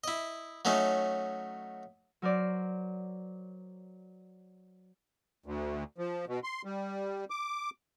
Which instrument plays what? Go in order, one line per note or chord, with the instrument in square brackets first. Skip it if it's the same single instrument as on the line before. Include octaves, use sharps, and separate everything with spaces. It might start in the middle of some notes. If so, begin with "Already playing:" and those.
[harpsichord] E4 D#5
F#3 A3 C#4 D#4
[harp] F#3 A#4 C5 D5
[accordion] D2
F3
B2
C6
G3
D6